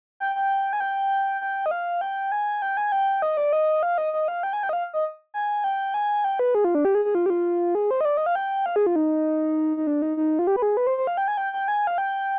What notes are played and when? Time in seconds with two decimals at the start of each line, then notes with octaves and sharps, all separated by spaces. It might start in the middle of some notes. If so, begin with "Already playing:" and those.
0.20 G5
0.36 G5
0.73 G#5
0.80 G5
1.41 G5
1.66 D#5
1.71 F5
2.01 G5
2.32 G#5
2.62 G5
2.77 G#5
2.92 G5
3.22 D#5
3.37 D5
3.53 D#5
3.83 F5
3.98 D#5
4.13 D#5
4.28 F5
4.43 G5
4.53 G#5
4.63 G5
4.69 D#5
4.73 F5
4.94 D#5
5.34 G#5
5.64 G5
5.94 G#5
6.24 G5
6.39 B4
6.55 G#4
6.64 F4
6.75 D4
6.85 G4
6.95 G#4
7.05 G#4
7.15 F4
7.26 G4
7.30 F4
7.75 G#4
7.91 C5
8.01 D#5
8.05 D5
8.17 D#5
8.26 F5
8.35 G5
8.66 F5
8.76 G#4
8.86 F4
8.96 D#4
9.77 D#4
9.87 D4
10.02 D#4
10.17 D#4
10.39 F4
10.47 G4
10.56 B4
10.62 G#4
10.77 B4
10.87 C5
10.97 C5
11.07 F5
11.17 G5
11.28 G#5
11.37 G5
11.53 G5
11.68 G#5
11.87 F5
11.98 G5